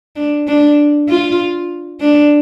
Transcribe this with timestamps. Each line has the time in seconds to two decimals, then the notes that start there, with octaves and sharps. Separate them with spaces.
0.16 D4
0.47 D4
1.09 F4
2.01 D4